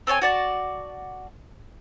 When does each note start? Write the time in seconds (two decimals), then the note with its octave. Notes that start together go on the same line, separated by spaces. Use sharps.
0.07 C4 A4 C#5 G#5
0.22 F#4 D5 A5